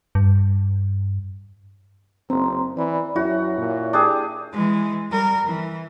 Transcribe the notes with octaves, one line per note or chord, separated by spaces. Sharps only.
G2
F#1 C4 A#5 C6
E3 D5 B5
F#2 E4 F#4 C#5 E5
A#2
D4 G4 G#4
E3 G#3
G3 A#4
E3